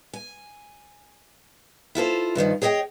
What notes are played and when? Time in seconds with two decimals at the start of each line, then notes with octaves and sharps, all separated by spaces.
0.13 G#5
1.95 E4 F4 A4 C5
2.35 G2 D3 D#3 F3
2.62 G#4 C#5 D#5 E5 G5